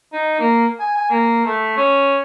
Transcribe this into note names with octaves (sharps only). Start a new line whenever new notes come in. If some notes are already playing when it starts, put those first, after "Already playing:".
D#4
A#3
G#5
G#5
A#3
A3
C#4